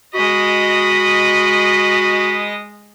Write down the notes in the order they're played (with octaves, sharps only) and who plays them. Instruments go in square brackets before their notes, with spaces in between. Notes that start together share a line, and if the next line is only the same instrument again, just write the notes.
[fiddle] G#3 D#5 [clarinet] F#4 [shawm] B5